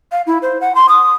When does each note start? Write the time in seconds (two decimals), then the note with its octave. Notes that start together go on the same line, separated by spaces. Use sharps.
0.12 F5
0.27 E4
0.42 C5
0.61 F#5
0.75 C6
0.89 D#6